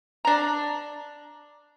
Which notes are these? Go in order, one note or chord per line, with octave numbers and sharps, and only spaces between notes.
D4 A#5